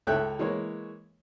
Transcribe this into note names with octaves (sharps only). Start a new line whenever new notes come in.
C#2 A4 C#5 E5 G5 F#6
E3 G#3 A#3 C#5